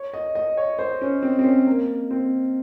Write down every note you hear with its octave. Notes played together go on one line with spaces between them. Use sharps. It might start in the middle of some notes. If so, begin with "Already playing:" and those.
Already playing: C#5
D#5
D#5
C#5
C5
C#4
C4
C4
C#4
A#3
C4